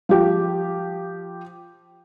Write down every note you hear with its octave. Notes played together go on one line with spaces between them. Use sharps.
F3 G4